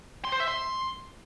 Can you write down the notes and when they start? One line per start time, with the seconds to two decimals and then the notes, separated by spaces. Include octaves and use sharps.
0.25 C6
0.32 C5
0.40 E5
0.48 C6